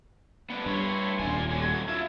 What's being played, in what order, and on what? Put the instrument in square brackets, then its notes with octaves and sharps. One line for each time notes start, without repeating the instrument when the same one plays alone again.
[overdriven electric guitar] B3 D4
[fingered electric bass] G2 [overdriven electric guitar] E4 C#5 [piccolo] C6
[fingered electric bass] D#1 G#1 [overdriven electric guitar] D5 G#5
[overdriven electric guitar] D3 F#3 [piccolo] G#6
[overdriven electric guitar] F4 E5